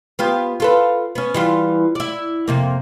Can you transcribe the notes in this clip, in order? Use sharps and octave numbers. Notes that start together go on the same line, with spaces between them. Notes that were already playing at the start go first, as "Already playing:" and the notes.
B3 F4 G4
F4 A4 B4
B3 C#4
E3 G3 F4
E4 D5
F2 C3 A#3